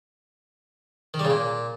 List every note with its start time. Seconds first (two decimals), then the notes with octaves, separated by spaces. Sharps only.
1.14 D#3
1.19 G3
1.25 C#3
1.30 A#2